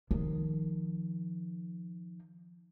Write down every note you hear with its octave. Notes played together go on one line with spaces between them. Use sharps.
D#3 F3